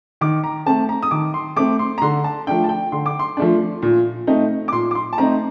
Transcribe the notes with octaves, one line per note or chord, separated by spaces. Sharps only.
D#3 D6
A#5
A3 C4 A5
A#5
D#6
D#3 D6
C6
A3 C4 D6
C6
A#5
D3 C6
A5
F3 A3 D4 G5
A5
G5
D3 C6
D6
C6
F3 A3 D4
A#2
A3 C4 D#4
D6
A#2 C6
D6
C6
A5
A3 C4 D#4 A#5